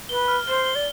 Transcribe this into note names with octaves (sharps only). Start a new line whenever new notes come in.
B4 G7
F6
C5 G7
G7
D5